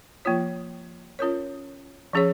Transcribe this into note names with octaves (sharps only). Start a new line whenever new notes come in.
F3 A#3 F4 C#5
C#4 F4 A#4 C#5
F3 C#4 G#4 C#5